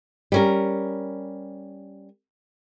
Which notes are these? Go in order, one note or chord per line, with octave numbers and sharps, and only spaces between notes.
G3 C#4 A#4